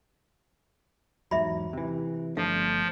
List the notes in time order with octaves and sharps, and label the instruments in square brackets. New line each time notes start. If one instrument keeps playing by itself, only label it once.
[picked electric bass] E2 G#2 F#3 [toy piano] E5 B5
[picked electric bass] C3 E3
[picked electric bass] G1 A3 D4 [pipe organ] F3 [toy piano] F5